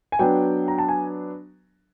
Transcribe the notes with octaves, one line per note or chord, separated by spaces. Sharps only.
G#5
F#3 B3 D4 G5
A#5
A5
G#5